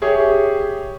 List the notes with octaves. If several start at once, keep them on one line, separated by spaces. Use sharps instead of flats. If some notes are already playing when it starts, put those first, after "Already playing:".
G4 G#4 C#5 E5